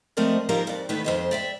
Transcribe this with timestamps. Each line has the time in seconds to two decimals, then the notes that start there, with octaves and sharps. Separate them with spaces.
0.17 F3 A3 C4 A#4 D5 D#5
0.49 F3 G3 A#3 D#4 G4 A#4
0.67 F2 D5
0.89 D#3 A3 B3 B4
1.04 F2 C5 D#5
1.31 D5 E5 G5